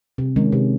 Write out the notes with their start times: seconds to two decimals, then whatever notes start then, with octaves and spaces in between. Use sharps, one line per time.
0.18 C3
0.36 D#3 G#3 C#4
0.52 C3